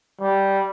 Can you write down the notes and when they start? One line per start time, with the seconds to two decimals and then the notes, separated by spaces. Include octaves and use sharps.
0.21 G3